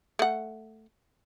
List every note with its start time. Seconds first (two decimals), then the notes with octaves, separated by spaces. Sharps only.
0.19 A3 F#5